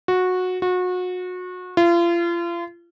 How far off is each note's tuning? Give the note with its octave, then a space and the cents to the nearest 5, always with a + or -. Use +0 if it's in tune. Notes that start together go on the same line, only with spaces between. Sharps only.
F#4 -15
F#4 -30
F4 -35